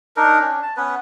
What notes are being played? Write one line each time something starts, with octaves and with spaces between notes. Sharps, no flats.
D4 D#4 A#4
C#4 D4
A5
B3 C#4 B4